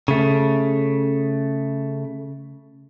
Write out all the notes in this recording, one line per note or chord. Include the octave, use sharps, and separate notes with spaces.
C#3 A3